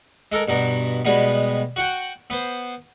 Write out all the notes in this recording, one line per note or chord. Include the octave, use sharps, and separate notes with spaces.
G#3 A4 A#4
G2 B2 A#4
B2 G3 G#3 B3
F#4 F#5 G5
B3 C5